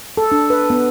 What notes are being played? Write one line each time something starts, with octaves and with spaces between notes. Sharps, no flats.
A4
D4
B4
B3